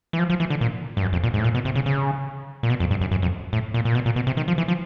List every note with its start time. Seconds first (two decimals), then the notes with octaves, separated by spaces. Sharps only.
0.13 E3
0.19 F3
0.30 F3
0.40 E3
0.50 D3
0.61 A#2
0.97 G2
1.02 F#2
1.13 F2
1.24 A#2
1.34 G#2
1.39 A2
1.44 A#2
1.55 B2
1.65 C3
1.75 C#3
1.86 C#3
2.63 A#2
2.70 B2
2.80 F2
2.91 G2
3.01 F#2
3.11 F#2
3.22 F2
3.53 A2
3.74 A#2
3.85 A#2
3.95 B2
4.06 A#2
4.16 B2
4.27 C3
4.37 D#3
4.48 F3
4.58 E3
4.68 F3